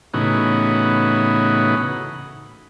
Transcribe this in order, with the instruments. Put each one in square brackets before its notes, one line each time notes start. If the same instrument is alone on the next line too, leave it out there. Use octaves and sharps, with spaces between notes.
[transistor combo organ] A2 C#3 E3 B3 D#4 F#4